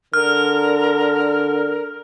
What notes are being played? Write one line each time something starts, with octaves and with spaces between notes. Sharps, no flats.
D3 A#4 F6